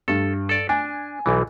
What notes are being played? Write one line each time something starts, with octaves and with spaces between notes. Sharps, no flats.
G2 A4
A4 D5
D4 G#5
B1 E3